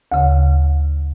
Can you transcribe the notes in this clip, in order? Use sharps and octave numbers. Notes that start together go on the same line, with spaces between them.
D2 C#3